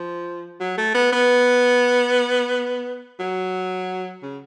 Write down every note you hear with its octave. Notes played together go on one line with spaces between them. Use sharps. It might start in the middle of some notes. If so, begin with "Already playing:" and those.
Already playing: F3
F#3
A3
B3
B3
F#3
C#3